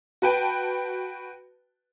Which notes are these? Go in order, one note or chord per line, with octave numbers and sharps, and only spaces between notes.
F#4 B4 G5 A5